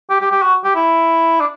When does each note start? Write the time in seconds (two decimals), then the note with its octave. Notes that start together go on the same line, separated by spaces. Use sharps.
0.10 G4
0.21 G4
0.31 G4
0.42 F#4
0.64 G4
0.75 E4
1.41 D4